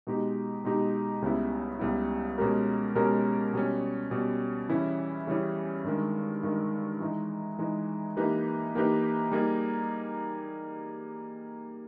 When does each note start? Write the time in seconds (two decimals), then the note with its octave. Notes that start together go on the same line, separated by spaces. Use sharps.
0.07 B2 G#3 D#4 G4
0.64 B2 G#3 D#4 G4
1.22 C#2 C#3 G3 B3 E4
1.79 C#2 C#3 G3 B3 E4
2.38 B2 G#3 C#4 G4 A#4
2.95 B2 G#3 C#4 G4 A#4
3.53 B2 G3 C#4
4.11 B2 G3 C#4
4.69 C#3 E3 G3 C#4 E4
5.27 C#3 E3 G3 C#4 E4
5.84 G2 D#3 G#3
6.43 G2 D#3 G#3
7.00 E3 G#3 D#4
7.59 E3 G#3 D#4
8.17 E3 A#3 D#4 G4 B4
8.75 E3 A#3 D#4 G4 B4
9.32 G3 A#3 D#4 G#4